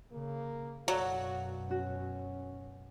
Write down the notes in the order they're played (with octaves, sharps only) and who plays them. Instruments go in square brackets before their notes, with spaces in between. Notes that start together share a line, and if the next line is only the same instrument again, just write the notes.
[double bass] C#3 [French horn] A#3
[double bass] F#2 B2 [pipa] F#3 [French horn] F#4 [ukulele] A4 D5 F5
[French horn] C#4 [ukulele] F#4